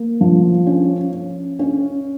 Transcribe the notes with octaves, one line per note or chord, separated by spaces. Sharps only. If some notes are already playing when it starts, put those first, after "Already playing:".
Already playing: A#3
F3
C#4
C#4
C#4